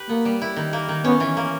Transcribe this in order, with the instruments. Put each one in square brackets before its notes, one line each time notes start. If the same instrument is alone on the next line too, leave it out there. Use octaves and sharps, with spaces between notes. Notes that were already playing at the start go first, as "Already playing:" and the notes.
Already playing: [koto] G4 B4
[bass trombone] A#3 [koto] B3
[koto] G3
E4
D#3
A#3
D#3
[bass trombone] B3 [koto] C#4
[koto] E3
A#3